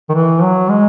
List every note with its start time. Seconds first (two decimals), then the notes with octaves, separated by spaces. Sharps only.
0.09 D#3
0.14 E3
0.43 F#3
0.70 G#3